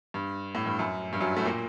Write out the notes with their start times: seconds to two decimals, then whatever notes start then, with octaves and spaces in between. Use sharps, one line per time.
0.14 G2
0.55 A2
0.66 G2
0.79 F#2
1.13 G2
1.20 F#2 F#3
1.37 A2 A3
1.45 A#2 A#3